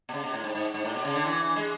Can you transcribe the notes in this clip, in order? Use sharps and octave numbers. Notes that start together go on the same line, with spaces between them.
B2
C#3
B2
A2
G#2
G#2
G#2
A2
B2
C#3
D3
E3
G#3